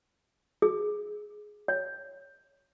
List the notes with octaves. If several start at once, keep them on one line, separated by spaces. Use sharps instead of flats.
G#4
C#5